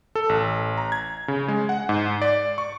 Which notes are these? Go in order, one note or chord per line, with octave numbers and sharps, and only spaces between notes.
A4
A1
A#5
G#6
C#3
G#3
F#5
G#2
D5
C#6